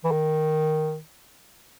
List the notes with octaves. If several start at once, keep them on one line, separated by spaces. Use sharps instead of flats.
E3
D#3